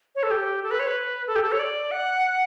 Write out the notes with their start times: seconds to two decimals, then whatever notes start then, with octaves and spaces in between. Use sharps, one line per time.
0.15 C#5
0.23 A4
0.31 G4
0.63 A4
0.71 B4
0.79 C#5
0.87 B4
1.27 A4
1.36 G4
1.43 A4
1.52 C#5
1.59 D5
1.91 F#5